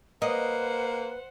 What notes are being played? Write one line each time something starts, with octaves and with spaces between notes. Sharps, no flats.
A#3 B4 C5 D#5 F#5